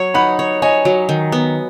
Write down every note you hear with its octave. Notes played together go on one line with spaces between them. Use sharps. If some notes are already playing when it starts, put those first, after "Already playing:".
Already playing: F#3 C#5
D#4 F#5 B5
C#5
C#5 D#5 G#5
F#3
D#3
B3